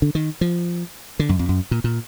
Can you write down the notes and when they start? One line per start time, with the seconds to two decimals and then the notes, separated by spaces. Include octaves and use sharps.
0.02 D3
0.15 D#3
0.41 F3
1.19 D3
1.29 F#2
1.39 F2
1.49 F#2
1.71 A#2
1.84 A#2